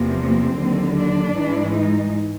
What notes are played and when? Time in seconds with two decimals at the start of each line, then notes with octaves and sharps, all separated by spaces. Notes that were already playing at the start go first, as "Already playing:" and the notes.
Already playing: E2 C3 F3 A#3
0.20 C4
0.58 D#2 D3 F#3
0.97 D4
1.35 G#2 E3 G#3
1.73 D#4